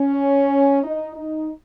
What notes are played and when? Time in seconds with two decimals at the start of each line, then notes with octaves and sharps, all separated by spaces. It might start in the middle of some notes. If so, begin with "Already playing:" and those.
Already playing: C#4
0.84 D#4
1.16 D#4